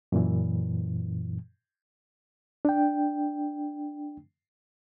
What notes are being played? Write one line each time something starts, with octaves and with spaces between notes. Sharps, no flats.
F#2 A#2 E3
D4 G5